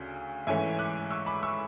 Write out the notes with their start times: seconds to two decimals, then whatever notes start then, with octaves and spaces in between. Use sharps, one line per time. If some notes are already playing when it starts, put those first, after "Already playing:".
Already playing: D2 C#3
0.47 G#2 E3 A3 C#4 E5 G#5
0.79 D6 F#6
1.11 C#6 E6
1.26 B5 D6
1.43 C#6 E6